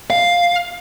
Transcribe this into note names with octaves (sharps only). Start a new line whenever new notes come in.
F5